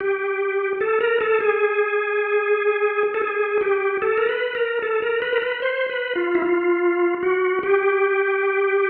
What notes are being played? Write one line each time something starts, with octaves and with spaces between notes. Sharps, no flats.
G4
A4
A#4
A4
G#4
A4
G#4
G4
A4
A#4
B4
A#4
A4
A#4
B4
A#4
B4
C5
B4
F4
E4
F4
F#4
G4